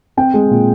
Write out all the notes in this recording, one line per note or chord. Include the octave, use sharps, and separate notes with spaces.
C4 G5
G#3
A#2